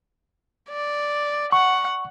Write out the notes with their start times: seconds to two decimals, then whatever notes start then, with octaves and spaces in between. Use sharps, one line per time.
0.70 D5
1.52 F#5 C#6